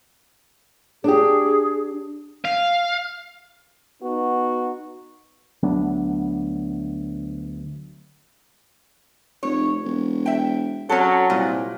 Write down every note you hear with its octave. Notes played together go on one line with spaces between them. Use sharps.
D4 G4 G#4
F5
B3 D#4 F#4
D2 F#3 B3 D4
F1 C#5
E1
E5 G5
F#3 C#4 A4
C2 A#2